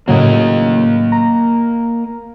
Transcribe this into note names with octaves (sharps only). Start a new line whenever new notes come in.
A2 C#3 F#3 A#3 D#5
A#5